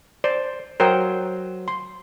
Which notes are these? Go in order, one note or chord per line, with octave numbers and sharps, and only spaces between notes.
C5 D5
F#3 A#4 C5 G5 D#6
C6